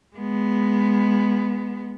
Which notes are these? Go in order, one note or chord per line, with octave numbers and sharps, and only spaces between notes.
G#3 B3